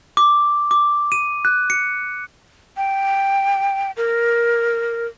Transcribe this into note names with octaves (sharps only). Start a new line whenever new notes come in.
D6
D6
D#7
F#6
C#7
G5
A#4